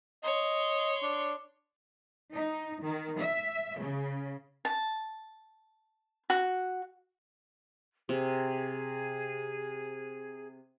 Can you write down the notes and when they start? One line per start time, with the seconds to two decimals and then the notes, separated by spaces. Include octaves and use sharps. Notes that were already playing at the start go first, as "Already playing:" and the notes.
0.24 C#5 D#5 C6
1.02 D4
2.33 D#4
2.83 D#3
3.19 E5
3.79 C#3
4.65 A5
6.30 F#4
8.09 C3 G#4